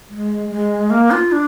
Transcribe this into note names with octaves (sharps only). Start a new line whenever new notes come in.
G#3
G#3
A#3
F4
D4